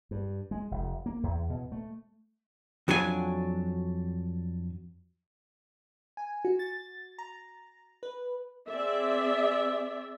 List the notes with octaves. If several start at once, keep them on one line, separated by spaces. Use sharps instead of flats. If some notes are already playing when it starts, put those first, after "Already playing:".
G2
G#3
F1
A#3
E2
B2
A3
F2 F#3 D4 G#4 G#5
G#5
F#4
A6
A#5
B4
C4 G#4 D5 E5